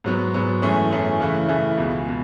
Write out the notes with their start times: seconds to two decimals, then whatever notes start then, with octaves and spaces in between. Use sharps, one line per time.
0.04 G#2 F#3 B3
0.34 G#2 F#3 B3
0.62 F#2 E3 A3 C#4 G#4
0.91 F#2 E3 A3 C#4 G#4
1.20 C#3 E3 A3 E4
1.48 C#3 E3 A3 E4
1.77 C#2 B2 G#3
2.08 B2